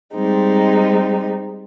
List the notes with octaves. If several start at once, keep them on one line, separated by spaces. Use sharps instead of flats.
G3 G#3 C4 D#4